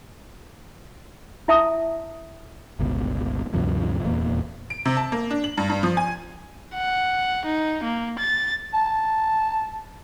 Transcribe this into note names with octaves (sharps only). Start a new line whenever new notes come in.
E4 E5 A5 D#6
G1 C#2 B2
D2 G2 C3 F3
D#1 E2 A#2 A#3
D7
C3
A5
A#3
D4
F#7
G2
G2
F3
G#5
F#5
D#4
A#3
A6
A5